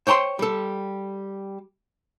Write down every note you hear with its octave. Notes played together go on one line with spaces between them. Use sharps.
C5 C#5 G5 A5 C6
G3 A4